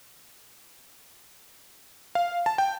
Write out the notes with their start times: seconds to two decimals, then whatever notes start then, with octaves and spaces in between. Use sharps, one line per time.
2.15 F5
2.46 A5
2.58 G5